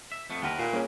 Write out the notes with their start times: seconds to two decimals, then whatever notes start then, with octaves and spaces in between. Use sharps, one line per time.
0.12 E5
0.30 F2 A3 B3
0.42 D#2 A3 A#4 B4 F#5
0.59 A#2
0.73 A#3 C#4 G#4